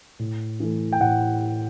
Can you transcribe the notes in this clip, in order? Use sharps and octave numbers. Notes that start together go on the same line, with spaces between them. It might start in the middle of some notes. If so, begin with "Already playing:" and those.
A2
E3 A3
G5
A2 F#5